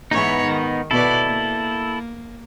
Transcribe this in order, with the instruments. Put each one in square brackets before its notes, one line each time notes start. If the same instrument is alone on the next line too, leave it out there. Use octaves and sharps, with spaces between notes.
[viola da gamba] G#2 E3 C#5 [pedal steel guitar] B3 D#4
[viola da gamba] D#3
[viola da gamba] B2 B3 D5 [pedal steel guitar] E4 A4
[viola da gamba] A#3